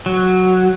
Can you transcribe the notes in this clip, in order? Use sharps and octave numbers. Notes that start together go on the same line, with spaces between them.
F#3